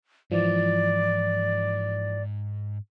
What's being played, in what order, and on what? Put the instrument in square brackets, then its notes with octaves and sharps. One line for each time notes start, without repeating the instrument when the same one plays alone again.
[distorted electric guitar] G#2 [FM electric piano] E3 F3 [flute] D5